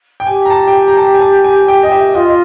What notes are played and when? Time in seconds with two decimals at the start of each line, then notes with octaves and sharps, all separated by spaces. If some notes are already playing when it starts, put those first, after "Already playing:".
0.20 G5
0.27 G4 G#5
0.45 A#5
0.50 A5
0.68 G5
0.74 G#5
0.88 A#5
0.97 A5
1.15 G#5
1.20 A5
1.44 G#5
1.68 G5
1.83 D#5
1.92 E5
2.14 F4 D#5
2.28 D#5